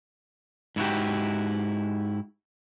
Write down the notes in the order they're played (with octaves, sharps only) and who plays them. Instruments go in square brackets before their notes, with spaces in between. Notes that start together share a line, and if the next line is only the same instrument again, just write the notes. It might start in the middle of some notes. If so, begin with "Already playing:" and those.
[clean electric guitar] G#2 E4 F#4 G4